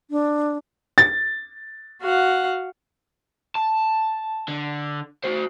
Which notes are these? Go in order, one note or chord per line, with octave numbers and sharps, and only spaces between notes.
D4
A6
F#4 F5 F#5
A5
D3
F#4 C5